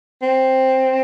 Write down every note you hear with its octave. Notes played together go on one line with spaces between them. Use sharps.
C4